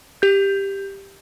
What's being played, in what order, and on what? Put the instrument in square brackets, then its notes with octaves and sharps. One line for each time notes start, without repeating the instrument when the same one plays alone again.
[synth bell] G4 G6